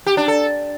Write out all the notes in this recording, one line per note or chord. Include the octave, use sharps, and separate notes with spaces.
G4
D4
A4